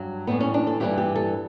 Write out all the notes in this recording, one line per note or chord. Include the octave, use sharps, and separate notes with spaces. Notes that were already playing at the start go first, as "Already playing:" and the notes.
Already playing: G2 F#3
A2 E3 G3 B3
C#4
D4
A4
G2 E3 G3 G4
G4
A4